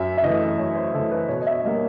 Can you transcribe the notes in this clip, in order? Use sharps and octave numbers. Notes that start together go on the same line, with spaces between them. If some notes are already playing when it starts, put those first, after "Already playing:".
Already playing: F#2 E5
E5
C#3 E3 A3 D#5
F#2 C#5
C5
C#3 E3 A3 A4
B4
B2 C#5
D#5
E5
G3 A#3 D#5